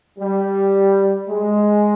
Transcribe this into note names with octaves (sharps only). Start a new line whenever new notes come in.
G3
G#3